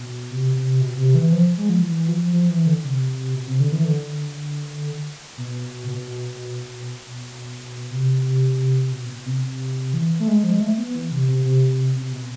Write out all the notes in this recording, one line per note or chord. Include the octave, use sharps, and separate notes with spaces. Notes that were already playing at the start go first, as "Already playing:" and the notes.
Already playing: B2
C3
C3
B2
B2
C3
E3
F3
G#3
F3
E3
F3
F3
E3
D3
C3
B2
C3
D3
E3
D3
B2
B2
C3
B2
B2
C3
E3
A3
G#3
F3
G#3
A3
B3
E3
C3
C3
C3
C3
B2